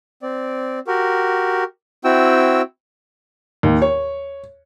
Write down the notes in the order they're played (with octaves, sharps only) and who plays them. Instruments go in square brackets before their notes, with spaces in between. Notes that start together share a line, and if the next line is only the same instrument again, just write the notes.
[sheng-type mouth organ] C4 D5
F#4 G4 A#4
C4 E4 F#4 G5 E6
[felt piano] D#2
C#5